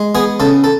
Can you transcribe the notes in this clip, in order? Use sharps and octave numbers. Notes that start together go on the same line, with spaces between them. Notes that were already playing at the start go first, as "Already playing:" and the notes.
Already playing: G#3
B3 G#4
C#3 A4
A4